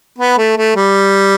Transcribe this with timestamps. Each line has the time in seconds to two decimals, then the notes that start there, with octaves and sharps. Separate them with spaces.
0.18 B3
0.38 A3
0.57 A3
0.76 G3